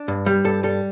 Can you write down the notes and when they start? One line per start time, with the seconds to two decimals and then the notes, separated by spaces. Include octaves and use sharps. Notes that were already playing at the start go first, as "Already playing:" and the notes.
Already playing: D4
0.08 G2
0.26 G3
0.44 G2 A4
0.63 G3 A4